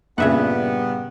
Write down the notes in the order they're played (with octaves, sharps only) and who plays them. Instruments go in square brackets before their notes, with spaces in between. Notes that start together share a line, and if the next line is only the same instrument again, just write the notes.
[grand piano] G2 A#2 [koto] C#3 E5 F#5 [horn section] G3 B3